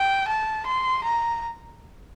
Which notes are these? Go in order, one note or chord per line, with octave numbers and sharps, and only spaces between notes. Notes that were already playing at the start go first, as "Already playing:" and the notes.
Already playing: G5
A5
C6
A#5